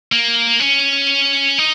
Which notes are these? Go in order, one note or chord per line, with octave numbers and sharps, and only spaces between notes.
A#3
C#4
D#4